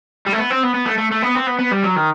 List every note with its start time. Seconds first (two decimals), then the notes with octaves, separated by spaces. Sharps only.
0.26 G3
0.32 A3
0.38 B3
0.50 C4
0.63 B3
0.74 B3
0.86 A3
0.98 A3
1.12 A3
1.22 B3
1.35 C4
1.47 B3
1.59 B3
1.71 G3
1.84 F#3
1.96 D#3